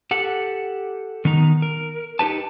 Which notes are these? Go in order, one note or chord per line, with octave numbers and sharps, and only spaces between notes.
G4 A4 F#5
D#3 B3 D#4 A#5
A#4
D#4 G4 B4 A5